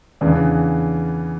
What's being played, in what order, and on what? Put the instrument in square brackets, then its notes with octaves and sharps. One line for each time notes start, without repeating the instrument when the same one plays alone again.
[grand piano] E2 C#3 E3 D4